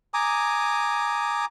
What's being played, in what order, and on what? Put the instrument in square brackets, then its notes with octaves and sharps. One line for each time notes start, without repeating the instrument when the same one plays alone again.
[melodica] G#5 A#5 D6 D#6